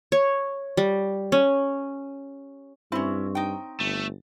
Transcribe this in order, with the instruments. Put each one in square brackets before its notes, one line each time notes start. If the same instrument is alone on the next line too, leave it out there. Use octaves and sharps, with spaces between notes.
[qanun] C#5
G3
C#4
[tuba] G2 [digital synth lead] C4 [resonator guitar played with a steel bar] C#4 E4
[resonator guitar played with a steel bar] D#4 G5
[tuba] G1 [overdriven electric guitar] A3